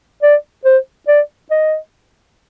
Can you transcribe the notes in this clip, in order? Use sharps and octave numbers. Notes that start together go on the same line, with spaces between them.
D5
C5
D5
D#5